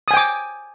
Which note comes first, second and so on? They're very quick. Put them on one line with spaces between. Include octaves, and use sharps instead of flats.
D#6 G#5 G5 D6